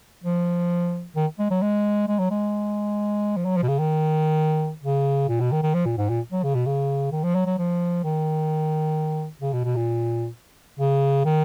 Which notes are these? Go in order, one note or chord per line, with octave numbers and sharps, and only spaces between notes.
F3
D#3
G#3
F#3
G#3
G#3
F#3
G#3
F3
F#3
F3
B2
C#3
D#3
C#3
A#2
B2
D#3
D#3
F3
A#2
G#2
A#2
F#3
C#3
B2
C#3
D#3
F3
F#3
F#3
F3
D#3
C#3
B2
B2
A#2
C#3
D#3